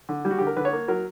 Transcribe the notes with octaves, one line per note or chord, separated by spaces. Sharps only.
D3
G3
F#4
D3 G4
A#4
D3 B4
C#5
A#3
F#3 A#4